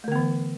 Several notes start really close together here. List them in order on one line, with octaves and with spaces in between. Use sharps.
A3 D3 B3 E3